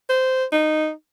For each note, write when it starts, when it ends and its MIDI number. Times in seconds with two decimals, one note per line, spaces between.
0.09 0.45 72
0.52 0.91 63